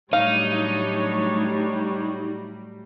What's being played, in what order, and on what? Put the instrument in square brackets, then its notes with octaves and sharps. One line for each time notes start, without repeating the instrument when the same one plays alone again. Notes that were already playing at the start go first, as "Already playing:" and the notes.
[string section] A2 F#3 G3 [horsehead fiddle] D4 C#5 [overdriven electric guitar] D#4 [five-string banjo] F5